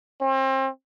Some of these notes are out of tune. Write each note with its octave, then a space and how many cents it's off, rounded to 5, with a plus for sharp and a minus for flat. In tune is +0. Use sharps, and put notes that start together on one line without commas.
C4 +35